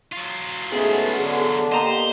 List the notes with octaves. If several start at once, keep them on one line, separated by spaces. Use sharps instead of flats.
F#3 F4
G#2 A3 B3 C#4 G#4
D3
A#3 B3 G4 C5 D#5 A#5